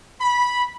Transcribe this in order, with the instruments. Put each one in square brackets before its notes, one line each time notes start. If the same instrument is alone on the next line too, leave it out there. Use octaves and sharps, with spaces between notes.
[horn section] B5